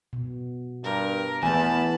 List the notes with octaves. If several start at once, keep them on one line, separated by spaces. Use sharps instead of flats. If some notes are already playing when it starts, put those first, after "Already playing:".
B2
G2 A#4
E2 E3 A3 B3 G#5 A5 B5